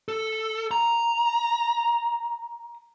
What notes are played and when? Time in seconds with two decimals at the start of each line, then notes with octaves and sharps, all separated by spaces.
0.08 A4
0.71 A#5